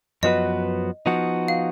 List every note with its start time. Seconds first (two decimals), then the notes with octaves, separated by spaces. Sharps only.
0.23 F#2 F3 B3 F#4 B4 D#5
1.06 F3 B3 D#4 F#4
1.48 F5